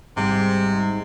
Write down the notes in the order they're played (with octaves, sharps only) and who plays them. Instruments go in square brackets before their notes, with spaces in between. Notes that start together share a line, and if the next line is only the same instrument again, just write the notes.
[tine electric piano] G#1 G3 [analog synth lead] G#2 [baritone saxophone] C3